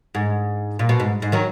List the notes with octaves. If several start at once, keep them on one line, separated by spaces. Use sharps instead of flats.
G#2
A#2
B2
G#2
G#2
D#3 F#3